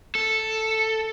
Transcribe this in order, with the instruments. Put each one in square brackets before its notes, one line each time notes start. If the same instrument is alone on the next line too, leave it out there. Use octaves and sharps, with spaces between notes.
[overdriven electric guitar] A4